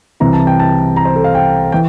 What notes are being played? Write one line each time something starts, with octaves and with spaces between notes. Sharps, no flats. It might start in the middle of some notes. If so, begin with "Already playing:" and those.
C2 C3 E3 A#5
A5
G5
A5
A#5
C5
A4
F5
G5
E3 G5